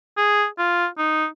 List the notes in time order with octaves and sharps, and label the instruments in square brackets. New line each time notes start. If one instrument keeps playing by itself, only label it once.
[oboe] G#4
F4
D#4